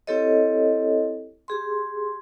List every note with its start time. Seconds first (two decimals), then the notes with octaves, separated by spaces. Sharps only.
0.07 C4 E4 G4 A4 C#5 D#5
1.48 G4 G#4 C6